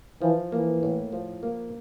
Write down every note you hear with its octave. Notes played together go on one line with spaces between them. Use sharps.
E3 F3
E3 A#3
A2
F3
A#3